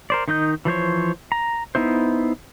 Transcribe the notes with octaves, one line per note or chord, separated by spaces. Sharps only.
A#4 C5 D5
D#3 D#4 D#5 G6
E3 F3 C5 C#5
A#5
B3 D#4 E4 C5